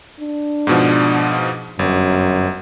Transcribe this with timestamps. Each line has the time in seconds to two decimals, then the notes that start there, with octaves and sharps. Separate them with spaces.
0.20 D4
0.67 G#2 B2 F3
1.79 G1 F#2